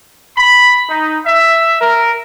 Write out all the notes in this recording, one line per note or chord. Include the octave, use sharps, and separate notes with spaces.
B5
D#4
E5
A#4